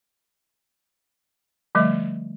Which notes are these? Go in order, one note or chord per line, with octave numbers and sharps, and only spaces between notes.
D3 F3 G3 A3 D#5